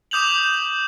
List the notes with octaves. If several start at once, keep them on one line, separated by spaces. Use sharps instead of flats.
D6 D#6 G6 F7 F#7